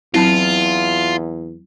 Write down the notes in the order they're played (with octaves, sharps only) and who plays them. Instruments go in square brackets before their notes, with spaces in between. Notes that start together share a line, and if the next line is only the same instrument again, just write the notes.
[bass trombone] E2 [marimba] F#3 C4 [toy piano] E4 A5 B5 [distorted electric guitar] F4